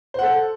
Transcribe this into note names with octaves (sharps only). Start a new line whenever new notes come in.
A4 C5 F#5